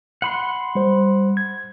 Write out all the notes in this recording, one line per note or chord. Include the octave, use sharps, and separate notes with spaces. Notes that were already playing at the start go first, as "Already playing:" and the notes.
F#5 B5 C6
G3 C5
G#6